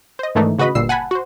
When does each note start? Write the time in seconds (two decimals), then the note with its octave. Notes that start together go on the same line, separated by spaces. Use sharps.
0.19 C5 D#5
0.35 G#2 D#3 E3 A3 D4 D#4
0.58 C#3 F#4 B4 D#5 B5
0.75 G1 A#2 G3 E6 C7
0.89 F#5 G#5 A5 B5
1.11 F#4 C5